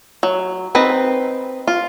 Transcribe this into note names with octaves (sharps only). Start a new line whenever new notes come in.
F#3
C4 D#4 B4
F4